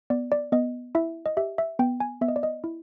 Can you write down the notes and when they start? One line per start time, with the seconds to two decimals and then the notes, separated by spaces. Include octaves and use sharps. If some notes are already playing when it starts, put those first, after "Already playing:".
0.10 B3 D5
0.32 D5
0.52 B3 D#5
0.95 E4 E5
1.26 D#5
1.37 G4 E5
1.58 E5
1.79 B3 G5
2.00 G#5
2.21 B3 E5
2.28 D#5
2.36 D5
2.43 D#5
2.64 E4